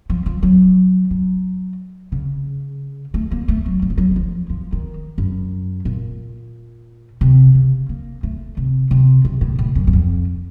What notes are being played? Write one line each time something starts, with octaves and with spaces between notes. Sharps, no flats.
F3
F3
F#3
F#3
C#3
A3
A#3
A3
F#3
F#3
F3
F#3
D#3
F3
F3
D#3
F#2
A#2
C3
C#3
A#3
A3
C3
C3
C3
A2
A2
F#2
F#2
F2